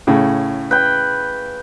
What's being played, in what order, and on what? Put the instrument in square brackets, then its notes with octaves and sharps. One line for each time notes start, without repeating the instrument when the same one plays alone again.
[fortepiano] A2 C#3
[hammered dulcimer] B4 G5